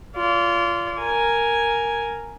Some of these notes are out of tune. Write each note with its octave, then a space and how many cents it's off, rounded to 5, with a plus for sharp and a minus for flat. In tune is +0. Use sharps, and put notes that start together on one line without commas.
F4 -15 D5 -40
A#4 +0 G#5 +0